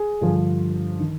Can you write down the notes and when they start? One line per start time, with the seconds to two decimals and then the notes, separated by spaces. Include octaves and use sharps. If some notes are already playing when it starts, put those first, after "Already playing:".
Already playing: G#4
0.21 G2 D3 F3
1.00 D#3